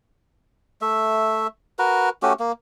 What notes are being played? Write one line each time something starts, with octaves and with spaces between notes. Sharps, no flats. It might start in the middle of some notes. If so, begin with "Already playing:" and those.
A3 E5
F#4 A#4 B4
A3 C#4 F#4 G4
A#3